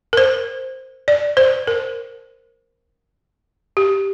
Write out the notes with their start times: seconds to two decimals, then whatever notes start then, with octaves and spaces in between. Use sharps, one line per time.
0.13 A#4
0.17 C5
1.08 D5
1.37 C5
1.67 A#4
3.77 G4